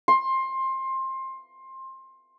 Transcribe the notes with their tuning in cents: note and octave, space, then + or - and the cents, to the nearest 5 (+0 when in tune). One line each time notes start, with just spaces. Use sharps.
C6 +20